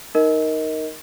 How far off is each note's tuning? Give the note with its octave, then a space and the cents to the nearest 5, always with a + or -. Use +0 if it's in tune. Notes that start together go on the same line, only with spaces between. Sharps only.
D#4 +0 A#4 +0 D#5 +20